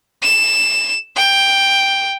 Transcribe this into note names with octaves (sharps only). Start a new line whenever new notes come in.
E7
G5